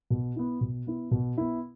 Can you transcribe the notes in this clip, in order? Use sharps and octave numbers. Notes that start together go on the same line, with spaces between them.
B2
B3 E4
B2
B3 E4
B2
B3 E4